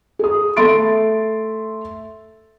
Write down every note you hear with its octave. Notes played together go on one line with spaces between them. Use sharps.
G#4 D#6
A3 A4 E5 C6 A6 D7